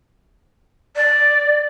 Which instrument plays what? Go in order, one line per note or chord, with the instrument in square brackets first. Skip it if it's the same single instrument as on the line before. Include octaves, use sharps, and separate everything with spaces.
[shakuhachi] D5